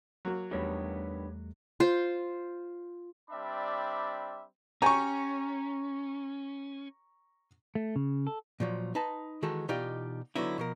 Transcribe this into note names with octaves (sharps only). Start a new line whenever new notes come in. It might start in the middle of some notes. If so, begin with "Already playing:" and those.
F#3 A#3 F#4
E2 G2 D#3 G3 A3 B3 G4 C#5
F4 C5
G3 C4 D4 D5 E5 B5
C#4 G4 C#5 G#5 A#5 C#6
A3
C#3
A4
A#2 F3 F#3
D#4 B4 A5
D#3 E3 G#3 F#4 A4
B2 E3 D#4 F4 G4 D5
D3 F#3 B3 D#4 E4
B2 F3 A#4